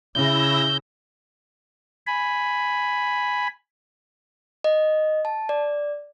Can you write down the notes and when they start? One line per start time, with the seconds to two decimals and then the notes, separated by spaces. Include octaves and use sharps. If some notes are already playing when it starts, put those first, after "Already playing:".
0.15 C#3 E4 E6 G6 A#6
2.07 G#5 B5
4.64 D#5
5.25 A5
5.49 D5